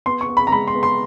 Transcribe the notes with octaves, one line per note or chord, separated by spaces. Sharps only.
B3 C6
C#6
B3
B5
A#5
G#3 B5
C6
B3
C6